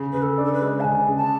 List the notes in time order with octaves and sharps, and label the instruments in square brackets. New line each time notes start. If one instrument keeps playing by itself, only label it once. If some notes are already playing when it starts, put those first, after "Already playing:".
Already playing: [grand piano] C#3
[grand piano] C#3 [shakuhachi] B4
[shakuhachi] A4
[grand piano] D4
[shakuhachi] A4
B4
[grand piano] G#3
[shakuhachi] A5
[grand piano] C#3 [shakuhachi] G#5
[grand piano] C#3
[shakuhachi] A5